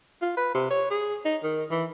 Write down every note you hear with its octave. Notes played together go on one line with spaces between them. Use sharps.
F4
B4
C3
C#5
G#4
D#4
D#3
E3